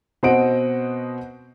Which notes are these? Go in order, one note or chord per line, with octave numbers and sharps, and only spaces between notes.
B2 C4 C5 D#5 F#5 D7